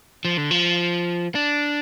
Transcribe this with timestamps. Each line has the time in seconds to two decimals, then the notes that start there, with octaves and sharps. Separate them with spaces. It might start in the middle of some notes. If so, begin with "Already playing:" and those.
0.25 F3
0.37 D3
0.51 F3
1.35 D4